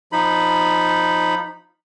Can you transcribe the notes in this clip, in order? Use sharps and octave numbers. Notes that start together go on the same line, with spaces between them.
F3 D#4 B5